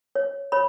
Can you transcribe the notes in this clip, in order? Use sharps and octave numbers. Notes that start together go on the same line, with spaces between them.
C#5
C#5 B5